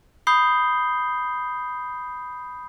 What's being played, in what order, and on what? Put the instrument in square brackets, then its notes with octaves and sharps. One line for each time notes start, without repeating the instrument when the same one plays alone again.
[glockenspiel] B5 D#6 G6 C7 G7